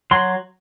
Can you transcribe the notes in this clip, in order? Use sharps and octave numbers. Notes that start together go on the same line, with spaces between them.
F#3 C6